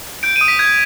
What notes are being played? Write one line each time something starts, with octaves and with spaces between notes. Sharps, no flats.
G6 D7
D#7
D#6
B6
G6 G#6